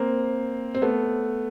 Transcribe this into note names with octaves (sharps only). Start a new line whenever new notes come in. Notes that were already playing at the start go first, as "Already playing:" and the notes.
Already playing: A#3 C4
C4
A3 B3